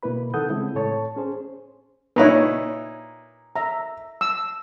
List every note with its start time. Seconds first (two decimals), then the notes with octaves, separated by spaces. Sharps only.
0.03 B2 A#3 E4 B4 B5
0.34 C3 D#3 A4 F#5 D#6 G6
0.49 C#3 G#3 C4 E4
0.75 A2 A4 C#5 A5 C#6
1.16 C#4 G#4 C5
2.16 A#2 D#4 E4 B4 C#5
3.56 E5 A#5
4.21 E6